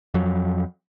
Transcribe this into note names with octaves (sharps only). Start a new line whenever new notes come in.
F2 F#3